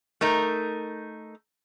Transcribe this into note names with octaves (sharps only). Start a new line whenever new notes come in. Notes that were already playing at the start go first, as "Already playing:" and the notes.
A3 D#4 A#4